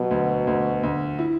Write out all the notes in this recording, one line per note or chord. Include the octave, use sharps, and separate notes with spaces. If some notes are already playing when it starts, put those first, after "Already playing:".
Already playing: B2 F#3
D2
D2
D2
E4